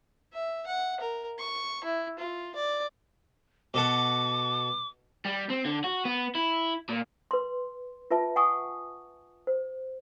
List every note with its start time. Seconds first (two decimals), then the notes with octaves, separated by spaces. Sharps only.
0.33 E5
0.66 F#5
1.00 A#4
1.38 C#6
1.84 E4
2.18 F4
2.55 D5
3.74 B2 A4 F#5 D6
5.25 G3
5.50 C4
5.65 D3
5.84 F#4
6.05 B3
6.35 E4
6.89 A#2
7.31 B4 C6
8.11 F4 B4 E5 A5
8.36 F#5 G#5 C#6 D#6
9.47 C5